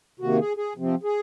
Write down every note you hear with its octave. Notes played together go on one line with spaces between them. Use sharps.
C3 D#3 A#3 F#4
G#4
G#4
C3 F3 C4
G#4